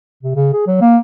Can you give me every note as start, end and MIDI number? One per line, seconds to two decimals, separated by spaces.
0.23 0.35 48
0.35 0.49 49
0.53 0.66 68
0.67 0.79 54
0.81 0.97 58